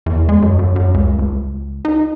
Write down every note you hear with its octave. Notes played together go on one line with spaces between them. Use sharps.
E2
G#3
F#2
F#2
F#2
C#2
C#2
D#4